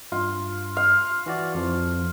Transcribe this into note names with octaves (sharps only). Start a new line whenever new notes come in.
G2 F4
F5
E3 F#4 D5
F2 F3